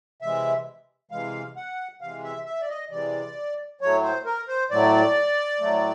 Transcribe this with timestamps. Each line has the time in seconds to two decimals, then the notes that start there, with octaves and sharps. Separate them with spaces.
0.22 C3 E3 G#3 E5
1.11 C3 E3 G#3 F5
1.56 F#5
2.01 C3 E3 G#3 F5
2.24 E5
2.46 E5
2.61 D5
2.69 D#5
2.90 C3 E3 G#3 D5
3.81 A2 F#3 A3 C#5
4.03 C5
4.25 A#4
4.48 C5
4.71 A2 F#3 A3 D5
5.60 A2 F#3 A3